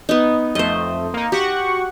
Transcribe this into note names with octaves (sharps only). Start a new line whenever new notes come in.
B3 D#4
F2 A3 C5 D#5
A#3 D#4
F#4 G4 F#5 C#6